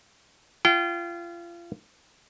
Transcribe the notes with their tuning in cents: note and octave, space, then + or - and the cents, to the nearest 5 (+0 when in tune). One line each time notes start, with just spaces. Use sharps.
F4 -30 G5 -30